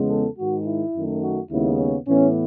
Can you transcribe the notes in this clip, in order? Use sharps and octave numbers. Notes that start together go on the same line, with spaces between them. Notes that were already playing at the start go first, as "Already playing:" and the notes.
Already playing: E2 C#3 G#3 B3
A4
G#2 D#3 G#3 F#4
E4
F#2 D#3 A3
F#4
D#2 C#3 G#3 B3 E4
C#4
A2 E3 B3 C#4